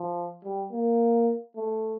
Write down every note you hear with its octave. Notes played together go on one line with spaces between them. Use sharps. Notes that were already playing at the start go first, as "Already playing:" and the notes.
Already playing: F3
G3
A#3
A3